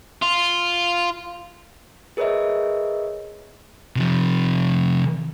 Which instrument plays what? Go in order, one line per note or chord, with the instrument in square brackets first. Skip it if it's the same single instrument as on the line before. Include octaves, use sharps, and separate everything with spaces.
[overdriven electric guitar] F4
[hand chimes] G#4 A#4 B4 C#5 D#5 E5
[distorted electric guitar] C3 F3